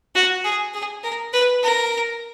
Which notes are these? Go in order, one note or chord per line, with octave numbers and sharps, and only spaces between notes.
F#4
G#4
G#4
A#4
B4
A#4